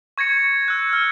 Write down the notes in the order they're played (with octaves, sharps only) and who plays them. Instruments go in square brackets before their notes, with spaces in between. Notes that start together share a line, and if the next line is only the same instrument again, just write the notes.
[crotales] C#6 G#6 A#6 C#7
E6 F#6
F6